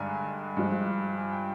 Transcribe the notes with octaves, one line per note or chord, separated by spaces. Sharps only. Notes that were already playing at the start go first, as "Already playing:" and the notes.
Already playing: G2 D3 G#3 D5 G#5 A#5
G2 F3 G#3
G#5
G5